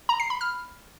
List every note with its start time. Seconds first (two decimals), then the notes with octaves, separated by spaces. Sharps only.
0.09 A#5
0.20 C7
0.30 B5
0.41 F6